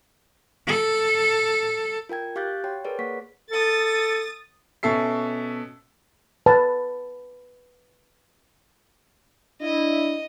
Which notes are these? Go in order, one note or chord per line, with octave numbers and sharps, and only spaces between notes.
A4
F4 A#4 G5 G#6
G4 F5 D6 F#6 G6 A6
F#4 C#5 G5
G#4 A#4 B4 C#5 D5
A#3 F#5 C#6 B6
A4 D#6 A6
B2 C#4 A4 E5 C7
B4 A5
D4 E4 D#5